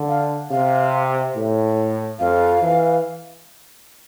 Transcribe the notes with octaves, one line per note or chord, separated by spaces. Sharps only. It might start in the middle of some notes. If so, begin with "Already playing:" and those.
Already playing: D3
F5
C3 F5
A2
F2 F5
E3